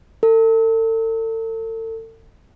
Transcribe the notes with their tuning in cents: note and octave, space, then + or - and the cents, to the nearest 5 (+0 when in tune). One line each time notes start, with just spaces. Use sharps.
A4 +40